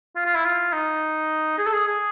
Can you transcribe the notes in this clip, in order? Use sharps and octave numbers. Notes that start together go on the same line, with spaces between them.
F4
F4
E4
F4
D#4
G#4
A4
G#4
G#4